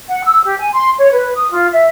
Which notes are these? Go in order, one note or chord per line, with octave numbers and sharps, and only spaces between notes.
F#5
E6
G4
G#5
C6
C#5
B4
D#6
F4
E5